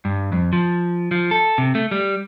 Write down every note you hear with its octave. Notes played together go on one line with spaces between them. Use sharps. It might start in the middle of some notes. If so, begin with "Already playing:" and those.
G2
F2
F3
F3
A4
C3
A3
G3